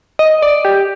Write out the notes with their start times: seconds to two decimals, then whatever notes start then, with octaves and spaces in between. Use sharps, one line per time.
0.19 D#5
0.42 D5
0.65 G4